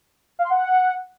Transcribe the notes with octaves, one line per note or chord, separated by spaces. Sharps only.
F5
C6
F#5